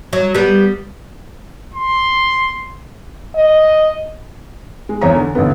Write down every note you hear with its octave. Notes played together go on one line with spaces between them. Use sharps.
F#3
G3 B3
C6
D#5
G#3
E2 C#5 A#5
D3
A1 D2 D3 B3